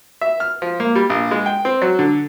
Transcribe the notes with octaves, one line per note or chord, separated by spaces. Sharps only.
E5
F6
F3
A#3
G3
A#1
G#3
G5
C4
F#3
D3